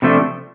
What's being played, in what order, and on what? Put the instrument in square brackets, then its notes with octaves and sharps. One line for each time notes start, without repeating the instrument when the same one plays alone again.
[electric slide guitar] C3 F3 A3 D4